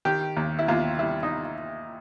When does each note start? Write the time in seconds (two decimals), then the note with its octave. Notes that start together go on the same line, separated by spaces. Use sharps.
0.05 D#3 G4
0.37 D#2
0.59 E4
0.68 D#2 F4
0.99 G3 E4
1.23 D#4